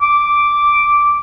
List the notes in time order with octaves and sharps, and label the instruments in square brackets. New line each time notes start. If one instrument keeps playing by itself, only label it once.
[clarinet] D6